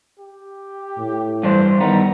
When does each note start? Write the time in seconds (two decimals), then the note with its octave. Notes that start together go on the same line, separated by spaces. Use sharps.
0.19 G4
0.98 A2
1.43 G2 E3 D4 C5
1.80 D#3 G3 B3 A#5